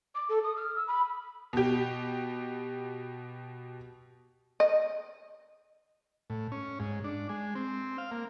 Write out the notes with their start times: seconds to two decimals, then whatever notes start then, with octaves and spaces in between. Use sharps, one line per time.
0.15 D6
0.29 A4
0.43 D#6
0.56 F6
0.76 E6
0.87 B5
1.53 B2 G4
4.60 D#5
6.30 A2
6.52 C#4
6.80 G#2
7.04 D4
7.29 G#3
7.55 C4
7.98 F5
8.11 A#3